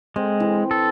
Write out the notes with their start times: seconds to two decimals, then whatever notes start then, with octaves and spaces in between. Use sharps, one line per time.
0.16 G#3 C4
0.40 E3
0.71 A4